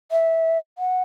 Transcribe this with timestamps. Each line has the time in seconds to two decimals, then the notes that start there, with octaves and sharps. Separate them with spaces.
0.11 E5
0.78 F#5